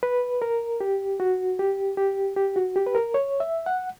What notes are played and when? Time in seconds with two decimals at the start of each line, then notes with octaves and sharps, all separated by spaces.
0.03 B4
0.42 A#4
0.81 G4
1.20 F#4
1.59 G4
1.97 G4
2.37 G4
2.56 F#4
2.76 G4
2.86 B4
2.95 A#4
3.14 C#5
3.40 E5
3.66 F#5